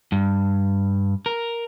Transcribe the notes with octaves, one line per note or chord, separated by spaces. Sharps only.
G2
A#4